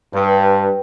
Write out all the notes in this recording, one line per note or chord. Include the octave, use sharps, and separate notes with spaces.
G2 B4 G5